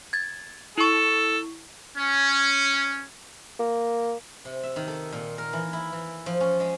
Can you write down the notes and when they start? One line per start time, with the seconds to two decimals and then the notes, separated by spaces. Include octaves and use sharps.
0.13 G#6 A6
0.78 E4 A4 C#6
1.97 C#4
3.59 A#3
4.45 C3
4.63 E5
4.76 D#3
4.88 A4
5.12 A#2
5.38 A#4
5.53 E3
5.73 E4
5.93 E3
6.26 F3
6.40 C#4
6.60 G#3